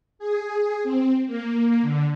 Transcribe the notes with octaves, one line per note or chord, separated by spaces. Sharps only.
G#4
C4
A#3
D3